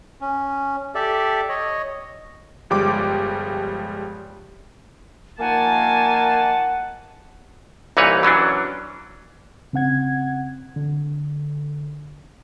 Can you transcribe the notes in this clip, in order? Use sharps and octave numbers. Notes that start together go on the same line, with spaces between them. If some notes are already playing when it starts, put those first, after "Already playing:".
C#4
G4 A4 D5 E5
C#5 D#5
G1 F3 G3 G#3 G5 D6
D#3 F3 A#3 F#5 G#5 A5
C2 A#2 E3 D#4 B4 C#5
E3 F#3 C#4 D4
C#3 C4 F#5 G#6
D3